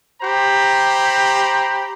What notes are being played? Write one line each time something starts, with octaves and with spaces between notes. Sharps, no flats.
G4 C5 A#5 B5